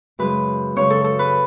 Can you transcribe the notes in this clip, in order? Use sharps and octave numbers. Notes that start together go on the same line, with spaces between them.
F#2 C#3 G#3 B4
F#2 C#3 G#3 C#5
A4
A4
B4